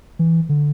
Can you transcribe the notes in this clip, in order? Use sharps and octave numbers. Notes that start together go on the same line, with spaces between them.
E3
D3